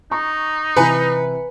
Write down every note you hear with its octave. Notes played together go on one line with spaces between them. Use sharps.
D#4 A#5 C#6
C3 E3 B4 G#5 A#5 C#7